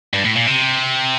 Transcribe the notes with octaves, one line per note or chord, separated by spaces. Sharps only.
G2
A2
A#2
C3